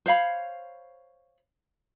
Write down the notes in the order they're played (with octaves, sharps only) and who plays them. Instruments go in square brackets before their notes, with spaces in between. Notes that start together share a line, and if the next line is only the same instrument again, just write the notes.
[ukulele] C5 C#5 F5 B5